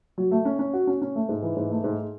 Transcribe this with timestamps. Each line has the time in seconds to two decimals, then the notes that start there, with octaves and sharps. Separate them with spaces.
0.18 F#3
0.31 A3
0.45 C#4
0.59 C#4
0.74 F#4
0.87 C#4
1.02 C#4
1.15 A3
1.29 G#2
1.43 E3
1.56 G#2
1.71 A3
1.84 G#2